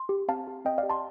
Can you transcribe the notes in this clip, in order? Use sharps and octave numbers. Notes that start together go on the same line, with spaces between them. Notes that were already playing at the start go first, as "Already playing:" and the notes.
Already playing: C6
G4
C4 F5 A5
G4
C4 D#5 G5
D5 F5
G4
A5 C6